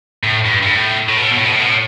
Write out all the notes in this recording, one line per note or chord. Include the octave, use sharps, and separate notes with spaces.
A2
G2
G2
A2
A2
B2
A2
B2
A2
B2
A2
B2
A2